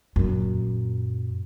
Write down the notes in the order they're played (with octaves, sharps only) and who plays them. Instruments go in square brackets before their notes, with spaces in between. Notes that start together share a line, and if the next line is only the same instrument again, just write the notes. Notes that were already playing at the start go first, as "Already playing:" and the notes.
[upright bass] F#2 A#2